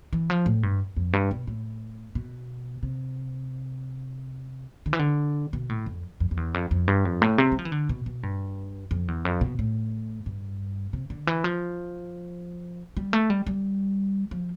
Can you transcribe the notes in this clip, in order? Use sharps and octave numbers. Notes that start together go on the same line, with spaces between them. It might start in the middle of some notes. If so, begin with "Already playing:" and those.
E3
F3
A2
G2
F2
G2
B2
A2
B2
C3
D3
E3
D3
B2
A2
F2
F2
F2
E2
F2
F2
G2
F2
A2
C3
G3
F3
E3
D3
B2
B2
G2
F2
E2
F2
B2
A2
G2
C3
D3
E3
F3
G3
A3
G3
G3
F3